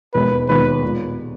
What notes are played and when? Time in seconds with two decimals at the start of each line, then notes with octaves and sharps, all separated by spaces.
0.14 E1 D#2 D#3 G#3 B4
0.49 E1 D#2 D#3 G#3 B4
0.83 A#2 G#3